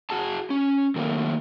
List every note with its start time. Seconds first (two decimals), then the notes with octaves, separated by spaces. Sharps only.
0.10 F#4 G#4 A5
0.50 C#4
0.96 D#3 F#3 A3 A#3 A#4